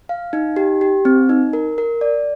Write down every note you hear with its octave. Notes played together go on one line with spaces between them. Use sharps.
F5
D#4
G4
G4
C4
D#4
A#4
A#4
D5